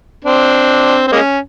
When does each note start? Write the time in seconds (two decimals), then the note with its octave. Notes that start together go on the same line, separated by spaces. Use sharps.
0.24 C4 D4
1.07 C4
1.12 G#3 A#3 C#4